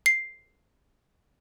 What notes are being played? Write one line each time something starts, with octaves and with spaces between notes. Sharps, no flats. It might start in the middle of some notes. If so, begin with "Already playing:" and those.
C7